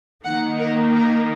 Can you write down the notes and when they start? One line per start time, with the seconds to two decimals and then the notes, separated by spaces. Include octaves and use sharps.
0.25 D#3 A#3 D#4 F#5
0.59 A#4
0.94 A#4